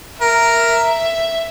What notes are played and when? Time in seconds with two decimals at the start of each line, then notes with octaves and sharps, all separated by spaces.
0.21 A#4 E5